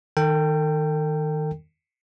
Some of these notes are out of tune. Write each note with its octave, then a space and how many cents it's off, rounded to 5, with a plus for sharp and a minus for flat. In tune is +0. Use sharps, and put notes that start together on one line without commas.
D#3 +0 A4 +45 G5 +0